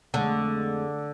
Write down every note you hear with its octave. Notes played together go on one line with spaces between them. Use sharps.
F2 D3 G#3 A3